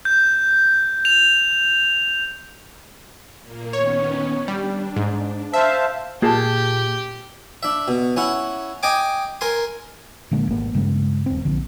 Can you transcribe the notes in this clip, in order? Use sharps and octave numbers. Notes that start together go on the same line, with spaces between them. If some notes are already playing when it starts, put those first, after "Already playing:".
G6
F7
A#2 A#3
D#3 B3 C#4 C#5
G3 D4
G#2
C5 E5 F5 A5
A#2 G4 G#4 A5
D4 E5
B2
C#4 E4 F#5
D#5 G5 G#5 D6
A#4 G#5 C6
A#2 D3 G#3 A#3
G#1 A#3
G2 C#3 G#3
D#1 C4
A#1 D3